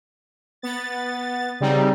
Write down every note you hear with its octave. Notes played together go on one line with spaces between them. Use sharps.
B3 A6
C#3 G3 C4 D#4